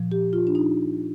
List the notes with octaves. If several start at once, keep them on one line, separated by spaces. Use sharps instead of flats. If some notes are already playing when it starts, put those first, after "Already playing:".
Already playing: A#2 F3
G4
F4
D4
D#4